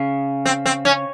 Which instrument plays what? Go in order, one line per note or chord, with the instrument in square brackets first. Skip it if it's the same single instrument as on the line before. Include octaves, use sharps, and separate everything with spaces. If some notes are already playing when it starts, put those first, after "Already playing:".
Already playing: [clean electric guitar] C#3
[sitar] C4
C4
C#4